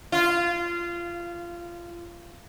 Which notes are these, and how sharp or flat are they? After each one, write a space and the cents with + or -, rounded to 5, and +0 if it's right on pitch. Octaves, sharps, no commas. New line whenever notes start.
F4 -20